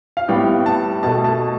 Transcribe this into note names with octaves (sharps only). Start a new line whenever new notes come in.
F5
A2 G3 B3 G5
A5
B2 A3 A5
A5